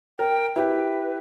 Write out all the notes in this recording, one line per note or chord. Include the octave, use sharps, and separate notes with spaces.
A#4 G5
E4 G4 B4